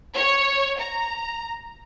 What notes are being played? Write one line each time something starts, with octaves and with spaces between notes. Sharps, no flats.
C#5
A#5